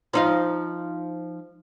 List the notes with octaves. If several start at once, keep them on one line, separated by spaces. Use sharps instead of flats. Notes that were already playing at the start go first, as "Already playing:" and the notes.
F3 D#4 F4